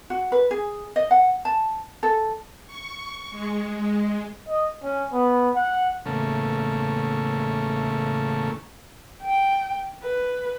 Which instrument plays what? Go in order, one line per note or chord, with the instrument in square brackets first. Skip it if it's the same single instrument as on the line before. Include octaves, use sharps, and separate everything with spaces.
[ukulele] F#4
B4
G#4
D#5
F#5
A5
A4
[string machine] C#6
G#3
[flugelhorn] D#5
C#4
B3
F#5
[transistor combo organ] E2 A2 C#3 A3 A#3 C#4
[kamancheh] G5
B4